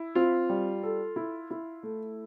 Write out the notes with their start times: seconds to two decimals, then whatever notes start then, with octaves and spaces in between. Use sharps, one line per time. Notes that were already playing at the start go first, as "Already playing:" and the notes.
Already playing: E4
0.15 C4 F4
0.49 G3
0.83 A4
1.16 E4
1.51 E4
1.83 A3